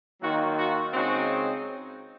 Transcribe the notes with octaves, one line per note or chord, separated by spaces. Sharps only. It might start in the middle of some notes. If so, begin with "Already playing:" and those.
D#3 F#3 A#3 F4 F#4
F#4
C#3 G#3 C4 D#4 F#4